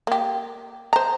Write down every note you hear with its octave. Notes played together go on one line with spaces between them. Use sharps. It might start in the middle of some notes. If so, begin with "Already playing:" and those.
A#3 G4
C5 A#5